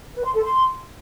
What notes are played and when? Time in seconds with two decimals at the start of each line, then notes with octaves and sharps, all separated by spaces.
0.15 B4
0.25 C6
0.34 A4
0.43 C6